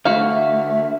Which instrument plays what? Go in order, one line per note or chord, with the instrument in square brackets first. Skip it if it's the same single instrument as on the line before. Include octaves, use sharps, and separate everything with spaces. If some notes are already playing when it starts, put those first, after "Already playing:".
[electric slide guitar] D3 A3 [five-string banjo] F#4 F5
[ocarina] E5